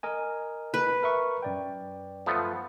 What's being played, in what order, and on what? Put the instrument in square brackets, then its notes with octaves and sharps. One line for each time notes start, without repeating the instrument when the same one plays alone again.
[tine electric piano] A#4 D#5 G#5
[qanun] B4
[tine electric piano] A#4 E5 C#6
F#2 D5 G5
[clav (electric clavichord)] F3 A3 B3